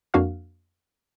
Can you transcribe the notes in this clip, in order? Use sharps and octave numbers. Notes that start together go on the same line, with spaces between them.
F2 A#3 D4 F#4 F5 F6